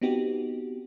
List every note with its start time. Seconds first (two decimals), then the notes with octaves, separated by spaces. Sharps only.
0.02 B3 C4 D#4 F#4 G4